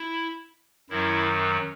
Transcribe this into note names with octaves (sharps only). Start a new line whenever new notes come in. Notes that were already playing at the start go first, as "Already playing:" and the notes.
Already playing: E4
F#2 D#3 F#3 E4